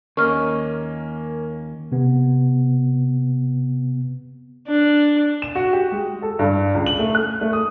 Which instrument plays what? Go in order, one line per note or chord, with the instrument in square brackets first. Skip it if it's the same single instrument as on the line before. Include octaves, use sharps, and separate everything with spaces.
[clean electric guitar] D#2 D#5 [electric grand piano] A#3 C#4 [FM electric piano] A#4 [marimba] C#6 F6
[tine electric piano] C3 B3
[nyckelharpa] D4
[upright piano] E7
F#4
G4
G#3
A4
G2
C#2
F#7
A3
F#6
A3
D#6